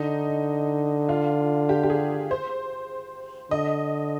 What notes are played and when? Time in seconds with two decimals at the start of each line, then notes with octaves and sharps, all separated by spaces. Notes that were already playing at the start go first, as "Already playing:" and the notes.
Already playing: D3 D#4
1.09 F4
1.69 G4
1.83 G4
1.90 G#4
2.31 C5
3.51 D3 D#5